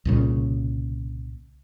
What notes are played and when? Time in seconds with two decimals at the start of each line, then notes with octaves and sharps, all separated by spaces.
0.05 C2 A#2 C#3